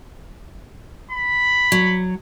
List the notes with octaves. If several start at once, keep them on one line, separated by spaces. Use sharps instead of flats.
B5
F#3